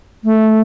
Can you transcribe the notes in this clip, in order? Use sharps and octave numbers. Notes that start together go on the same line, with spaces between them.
A3